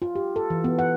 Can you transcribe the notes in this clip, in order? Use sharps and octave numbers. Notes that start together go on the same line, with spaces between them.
F4
G4
A4
E3
B3
F#5